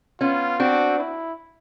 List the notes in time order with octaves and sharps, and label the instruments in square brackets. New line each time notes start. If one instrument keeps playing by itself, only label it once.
[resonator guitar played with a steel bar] B3 C#4 [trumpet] F4
[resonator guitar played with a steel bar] C4 D4 [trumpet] F#4
[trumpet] E4